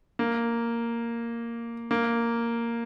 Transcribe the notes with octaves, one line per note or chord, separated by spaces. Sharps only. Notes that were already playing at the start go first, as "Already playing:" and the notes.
A#3
A#3